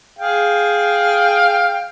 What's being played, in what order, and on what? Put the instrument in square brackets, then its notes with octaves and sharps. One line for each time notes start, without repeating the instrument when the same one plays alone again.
[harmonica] G#4 F5 G5